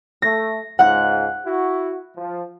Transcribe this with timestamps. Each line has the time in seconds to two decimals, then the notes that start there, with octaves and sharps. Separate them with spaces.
0.22 A3 A#6
0.79 C#2 G#2 F4 F#5 F#6
1.44 E4 F#4
2.16 F3